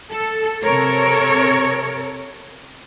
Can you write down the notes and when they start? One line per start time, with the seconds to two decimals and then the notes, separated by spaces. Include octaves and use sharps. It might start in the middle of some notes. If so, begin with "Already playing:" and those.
0.10 A4
0.62 C3 A4 A#4 C#5